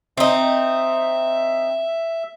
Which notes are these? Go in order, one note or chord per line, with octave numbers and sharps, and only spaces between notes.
C4 D#4 E5